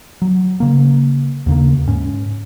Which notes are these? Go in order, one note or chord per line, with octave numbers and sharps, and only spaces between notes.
F#3
C#3 A#3
D#2 C#3 A#3
G#2 C#4